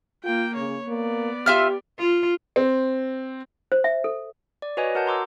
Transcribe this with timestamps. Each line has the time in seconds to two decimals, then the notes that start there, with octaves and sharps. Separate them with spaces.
0.24 A#3 F4 G5
0.56 C#3 C#5
0.88 A#3 B3 D5
1.46 F4 G4 E5 F6
1.99 F4
2.56 C4
3.72 C5
3.84 E5
4.04 A4
4.62 D5
4.77 F#4 B4 C#5 D#5 G#5
4.95 F#4 A#4 F#5 A5 G6
5.06 A#5 C6 D6 E6